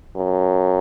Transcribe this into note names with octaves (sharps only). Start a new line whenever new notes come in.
F#2